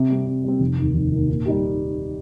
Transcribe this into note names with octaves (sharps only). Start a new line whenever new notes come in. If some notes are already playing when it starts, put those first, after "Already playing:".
Already playing: C3
G3 C4
C3
G3 C4
F1
D#2 D#3
F1
D#2 D#3
A#2
G3 D#4 G4